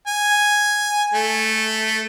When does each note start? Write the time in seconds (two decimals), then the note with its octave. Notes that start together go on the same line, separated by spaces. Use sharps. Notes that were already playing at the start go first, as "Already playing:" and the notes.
0.07 G#5
1.14 A3